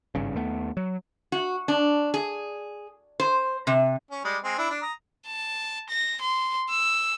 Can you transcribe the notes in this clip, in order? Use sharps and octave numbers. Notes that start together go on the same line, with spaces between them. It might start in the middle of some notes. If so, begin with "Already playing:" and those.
G#1 G2 C#3
D#2 A3 B3
F#3
F#4
D4
G#4
C5
C3
C#4
G3 G#3 D5
G#3 C4 G#5
D4 E4
D4
A#5 D#6
A5
A#6
C6
E6